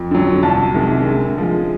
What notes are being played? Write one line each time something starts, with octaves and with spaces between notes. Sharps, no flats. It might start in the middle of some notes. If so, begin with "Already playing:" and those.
Already playing: F2
D3 F#3
C2 A5
C3 D#3 G#3
D3
F3 G#3